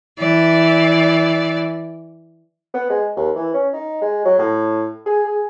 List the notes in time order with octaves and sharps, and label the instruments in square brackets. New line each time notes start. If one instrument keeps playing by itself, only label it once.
[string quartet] E3 D5
[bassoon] B3
G#3
D#2
E3
C#4
D#4
G#3
F#3
A2
G#4
G#4